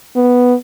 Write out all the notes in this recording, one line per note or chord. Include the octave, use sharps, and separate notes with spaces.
B3